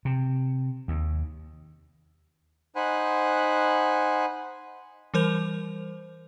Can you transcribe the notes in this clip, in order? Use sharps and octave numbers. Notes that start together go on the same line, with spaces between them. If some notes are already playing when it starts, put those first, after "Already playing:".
C3
D#2
D#4 C5 F#5 G#5 B5 F#6
E3 G3 A#4 C5 G6 F7